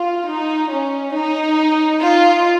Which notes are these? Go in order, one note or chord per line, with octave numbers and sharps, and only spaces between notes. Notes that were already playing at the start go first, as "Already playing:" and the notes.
Already playing: F4
D#4
C#4
D#4
F4